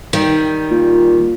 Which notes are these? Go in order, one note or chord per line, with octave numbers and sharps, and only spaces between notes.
D#3 G3
A#2